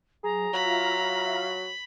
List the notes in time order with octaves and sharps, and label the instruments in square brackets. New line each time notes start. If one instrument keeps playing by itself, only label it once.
[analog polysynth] F#3 [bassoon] G#4 [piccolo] A#5
[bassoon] F#3 [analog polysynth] F4 E5 F5 [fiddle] B5